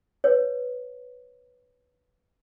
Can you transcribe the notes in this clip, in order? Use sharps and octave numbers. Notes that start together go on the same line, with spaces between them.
B4 C#5